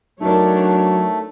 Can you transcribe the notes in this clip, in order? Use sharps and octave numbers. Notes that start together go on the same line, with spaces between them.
F#3 A3 D4 D#4 A#4 C#5